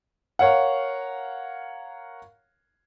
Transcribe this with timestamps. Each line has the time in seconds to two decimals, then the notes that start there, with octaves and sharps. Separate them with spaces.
0.39 A#4 C#5 F5 F#5